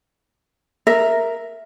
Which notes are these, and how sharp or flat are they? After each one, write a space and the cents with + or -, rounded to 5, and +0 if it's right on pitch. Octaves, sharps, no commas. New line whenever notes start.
A#4 +0 E5 +0